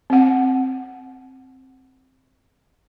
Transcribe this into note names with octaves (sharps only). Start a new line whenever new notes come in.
C4 F#5